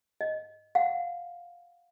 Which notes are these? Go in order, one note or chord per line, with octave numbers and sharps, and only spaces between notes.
D#5
F5 F#5